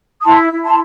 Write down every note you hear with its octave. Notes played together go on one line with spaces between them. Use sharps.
D#6
E4 A5 C6
E4
A5 C6